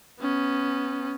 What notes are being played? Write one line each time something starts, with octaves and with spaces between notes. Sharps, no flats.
B3 C#4